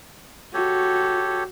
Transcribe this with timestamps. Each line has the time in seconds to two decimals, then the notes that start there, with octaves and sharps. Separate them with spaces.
0.54 F#4 G4 A4 C#5